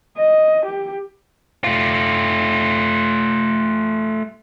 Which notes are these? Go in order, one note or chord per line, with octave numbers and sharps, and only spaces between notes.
D#5
G4
A3 F4